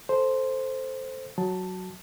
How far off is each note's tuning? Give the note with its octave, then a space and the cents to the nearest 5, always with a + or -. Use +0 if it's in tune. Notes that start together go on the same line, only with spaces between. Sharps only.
A4 +0 C5 +0
F#3 +0 A5 +5